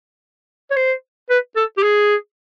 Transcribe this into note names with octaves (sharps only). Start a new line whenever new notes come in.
C#5
C5
B4
A4
G4
G#4